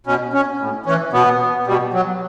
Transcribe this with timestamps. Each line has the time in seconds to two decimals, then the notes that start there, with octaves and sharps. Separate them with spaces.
0.06 B2 C#4
0.33 C#4
0.60 A2
0.86 E3 C#4
1.13 B2 B3
1.67 B2 G3
1.93 F#3